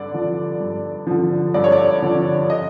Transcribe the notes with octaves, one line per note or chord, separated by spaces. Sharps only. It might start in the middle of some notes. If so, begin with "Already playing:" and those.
Already playing: G2 D3 D5
D3 F3
G2
D3 F3
G2 D5
C#5
D5
D3 F3
D#5